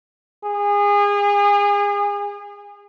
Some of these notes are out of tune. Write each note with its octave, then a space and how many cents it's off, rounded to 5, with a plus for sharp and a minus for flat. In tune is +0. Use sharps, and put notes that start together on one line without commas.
G#4 -30